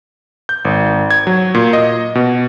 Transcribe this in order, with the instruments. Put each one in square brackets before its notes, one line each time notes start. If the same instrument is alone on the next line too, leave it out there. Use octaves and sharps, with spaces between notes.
[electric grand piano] G6
G#1
G#6
F#3
A#2
D#5
B2